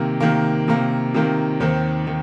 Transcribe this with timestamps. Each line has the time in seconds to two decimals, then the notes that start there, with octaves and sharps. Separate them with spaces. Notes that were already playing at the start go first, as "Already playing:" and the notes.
Already playing: C3 D#3 A#3
0.20 C3 D#3 A#3
0.68 C3 D#3 A#3
1.14 C3 D#3 A#3
1.60 D#2 D#3 C4
2.07 D#3